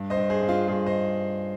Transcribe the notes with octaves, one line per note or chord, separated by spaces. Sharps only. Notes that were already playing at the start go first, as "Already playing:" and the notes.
Already playing: G2
C5 D#5
G2
G#4 C5
G2
F4 G#4
G2 F4 G#4
C5 D#5